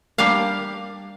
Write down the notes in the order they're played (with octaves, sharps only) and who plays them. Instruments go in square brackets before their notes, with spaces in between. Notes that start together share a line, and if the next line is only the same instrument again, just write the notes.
[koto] G3 A#3 D4 F5